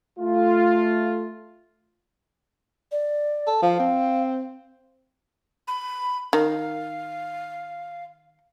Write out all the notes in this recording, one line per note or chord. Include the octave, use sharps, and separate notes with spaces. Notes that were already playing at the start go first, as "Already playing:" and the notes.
A3 F4
D5
A4
F3 F5
C4
B5
D#3 F5